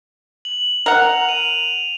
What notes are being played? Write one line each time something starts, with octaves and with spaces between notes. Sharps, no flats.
F#7
A#4 F#5 F7
D#7 F7